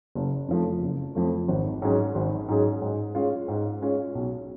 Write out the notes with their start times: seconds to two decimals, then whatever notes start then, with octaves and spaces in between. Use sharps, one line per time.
0.15 F#1
0.48 F2 F3 A3
0.82 F#1
1.15 F2 F3 A3
1.48 G#1
1.82 G#2 F#3 C#4 G#4
2.15 G#1
2.48 G#2 F#3 C#4 G#4
2.82 G#2
3.15 G#3 C#4 F4
3.48 G#2
3.82 G#3 C#4 F4
4.15 B1